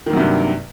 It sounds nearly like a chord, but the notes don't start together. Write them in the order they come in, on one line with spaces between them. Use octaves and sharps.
D#3 A#3 F#3 C3 G2